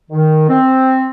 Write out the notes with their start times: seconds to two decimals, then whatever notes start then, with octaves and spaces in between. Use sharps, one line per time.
0.10 D#3
0.49 C4